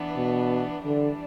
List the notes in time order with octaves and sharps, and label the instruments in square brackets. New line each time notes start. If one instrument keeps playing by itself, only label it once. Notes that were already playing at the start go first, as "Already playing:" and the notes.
Already playing: [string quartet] E3 B3 D4
[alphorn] B2
[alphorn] D3 [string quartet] E3 G3 D4